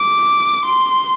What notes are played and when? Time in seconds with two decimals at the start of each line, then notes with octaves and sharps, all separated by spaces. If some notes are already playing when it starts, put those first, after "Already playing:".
Already playing: D6
0.66 C6